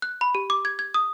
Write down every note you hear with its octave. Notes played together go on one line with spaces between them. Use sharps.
F#6
B5
G4
D6
G#6
G#6
D#6